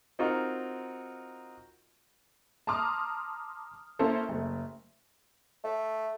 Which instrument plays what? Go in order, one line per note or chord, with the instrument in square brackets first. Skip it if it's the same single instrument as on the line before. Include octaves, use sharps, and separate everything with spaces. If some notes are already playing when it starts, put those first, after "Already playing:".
[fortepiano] C4 D#4 F4 F#4 A#4
[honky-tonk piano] A5 A#5 C6 D6 D#6 F6
A#3 C#4 E4 A4 C5
F#1 A3
[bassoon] A3